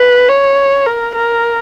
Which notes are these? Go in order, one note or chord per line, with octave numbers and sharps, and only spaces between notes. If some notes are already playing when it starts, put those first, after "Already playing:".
Already playing: B4
C#5
A#4
A#4